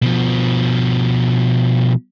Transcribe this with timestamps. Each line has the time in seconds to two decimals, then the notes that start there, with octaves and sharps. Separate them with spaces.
0.02 B2 F3